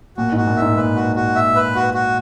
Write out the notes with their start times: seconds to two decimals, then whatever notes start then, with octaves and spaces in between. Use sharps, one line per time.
0.17 A#2 F#4
0.32 G#2 F#4
0.47 A#2
0.56 E5
0.62 G#2
0.76 A#2 B4
0.96 F#4
1.16 F#4
1.36 E5
1.56 B4
1.75 F#4
1.94 F#4